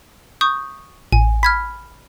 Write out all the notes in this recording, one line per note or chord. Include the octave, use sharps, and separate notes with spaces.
C#6 D#6 G6
A1 G#5
B5 F6 G#6 B6